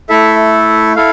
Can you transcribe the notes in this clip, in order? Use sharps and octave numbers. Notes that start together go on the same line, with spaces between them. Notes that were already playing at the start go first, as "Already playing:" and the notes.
A3 E4 A4 E5
E4 A4 F5